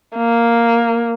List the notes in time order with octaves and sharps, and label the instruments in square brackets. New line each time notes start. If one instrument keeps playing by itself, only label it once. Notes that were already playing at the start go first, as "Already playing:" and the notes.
[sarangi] A#3